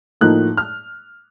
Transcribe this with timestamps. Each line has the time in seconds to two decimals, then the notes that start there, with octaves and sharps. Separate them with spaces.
0.21 A2 F3 A#3 D#4 F#6
0.57 F6